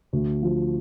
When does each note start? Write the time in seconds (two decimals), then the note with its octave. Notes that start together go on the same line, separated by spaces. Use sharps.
0.13 D2
0.43 F3